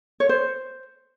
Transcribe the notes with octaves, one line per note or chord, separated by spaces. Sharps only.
C#5
C5